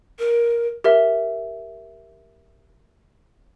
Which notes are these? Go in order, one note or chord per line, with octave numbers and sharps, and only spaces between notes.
A#4
G4 A#4 E5